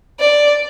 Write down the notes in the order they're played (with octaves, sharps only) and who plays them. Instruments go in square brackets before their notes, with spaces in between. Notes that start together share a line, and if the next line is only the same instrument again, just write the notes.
[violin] D5